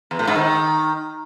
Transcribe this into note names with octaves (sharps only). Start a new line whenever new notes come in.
E2
A2
G#2
D#3